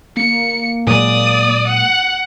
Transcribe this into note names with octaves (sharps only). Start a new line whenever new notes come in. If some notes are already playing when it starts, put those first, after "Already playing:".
A#3 C#7
A#2 F#3 G#3 D5 D#6
F#5